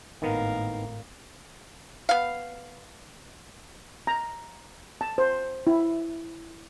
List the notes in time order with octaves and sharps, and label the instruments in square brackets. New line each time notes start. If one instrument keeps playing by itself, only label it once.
[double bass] G#1 A2 [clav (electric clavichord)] D#3 B3 [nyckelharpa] A#4 F5
[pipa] B3 F5
[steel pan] A#5
A5
C5
E4